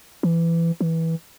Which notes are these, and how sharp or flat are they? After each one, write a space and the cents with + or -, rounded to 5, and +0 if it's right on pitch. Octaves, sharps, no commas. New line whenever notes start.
E3 +20
E3 -15